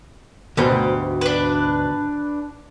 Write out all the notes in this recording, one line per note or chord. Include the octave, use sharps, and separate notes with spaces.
D2 G#2 B2 G4
D4 B4